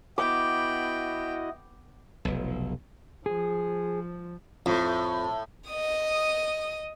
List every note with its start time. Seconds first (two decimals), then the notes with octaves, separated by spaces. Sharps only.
0.18 B3 E4 F#4 D#5 G5 D6
2.25 F1 B1
3.26 F3 G#4
4.66 F2 A2
5.69 D#5 D#6